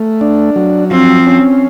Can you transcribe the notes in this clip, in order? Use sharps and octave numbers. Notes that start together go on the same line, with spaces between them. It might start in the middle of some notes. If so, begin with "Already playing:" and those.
Already playing: A3
D4
F#3
F3 C4
C#4